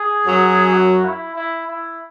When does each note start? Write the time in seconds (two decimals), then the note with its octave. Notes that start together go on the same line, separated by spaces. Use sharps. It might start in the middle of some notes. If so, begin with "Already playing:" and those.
Already playing: G#4
0.26 F#2 F#3
0.73 F#4
1.04 E4
1.35 E4
1.67 E4